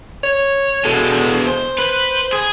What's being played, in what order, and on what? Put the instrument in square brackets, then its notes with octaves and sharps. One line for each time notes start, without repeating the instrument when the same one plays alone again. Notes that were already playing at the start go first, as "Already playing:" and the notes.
[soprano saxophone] C#5
[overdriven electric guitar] B2 G#3 [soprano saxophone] A4
[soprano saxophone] C5
[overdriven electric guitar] B4
G#4